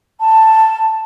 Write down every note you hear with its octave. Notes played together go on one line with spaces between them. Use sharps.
A5